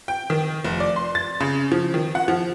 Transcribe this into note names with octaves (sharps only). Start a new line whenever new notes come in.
G5
D#3
F1
D5
C6
A6
C#3
F3
D#3
F#5
F3